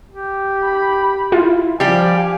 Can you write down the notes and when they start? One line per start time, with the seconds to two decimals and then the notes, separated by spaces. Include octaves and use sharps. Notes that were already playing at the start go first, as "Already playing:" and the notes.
0.11 G4
0.64 B5
1.32 E4 F4
1.80 F3 G3 G4 F5 G#5